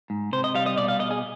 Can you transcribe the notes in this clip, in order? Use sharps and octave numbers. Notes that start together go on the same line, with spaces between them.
G#2
C3 C5
D#5
G3 F5
D#5
B2 D5
F5
B2 D#5
G#4